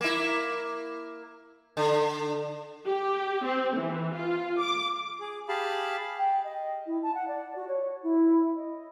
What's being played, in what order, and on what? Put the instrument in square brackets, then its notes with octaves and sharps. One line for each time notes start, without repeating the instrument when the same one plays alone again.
[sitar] A#3 E4
D3
[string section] G4
C4
E3
F4
D6
[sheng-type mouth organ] G#4
G4 G#4 F5 A5 B5
[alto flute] G5
D#5
E4
A5
F#5
D5
F#4
C#5
E4
D#5